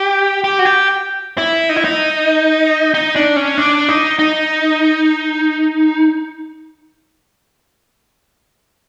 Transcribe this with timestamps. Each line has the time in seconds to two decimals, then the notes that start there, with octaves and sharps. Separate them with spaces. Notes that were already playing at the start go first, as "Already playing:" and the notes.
Already playing: G4
0.44 G4
0.59 F#4
0.65 G4
1.38 E4
1.69 D#4
1.76 E4
1.85 D#4
2.94 D#4
3.16 D4
3.36 C#4
3.57 D4
3.89 D#4
4.19 D#4